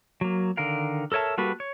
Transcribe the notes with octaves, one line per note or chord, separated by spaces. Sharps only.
F#3 A#3
D3 D#3 A#4 F5
A4 A#4 C#5 E5 A5
G3 A#3 F#4 A4 B4
C#5